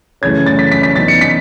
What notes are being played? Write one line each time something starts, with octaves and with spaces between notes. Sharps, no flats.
F#2 C#3 E3 A3 C#4 G#6
A6
B6
B6
B6
F#2 E3 B3 D#4 A6
C#7
B6